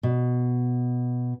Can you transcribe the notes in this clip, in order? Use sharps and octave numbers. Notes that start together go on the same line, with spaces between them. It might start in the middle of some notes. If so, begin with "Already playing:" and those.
B2